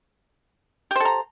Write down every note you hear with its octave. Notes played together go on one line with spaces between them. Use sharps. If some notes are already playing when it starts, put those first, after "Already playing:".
G4 A4 C5 A#5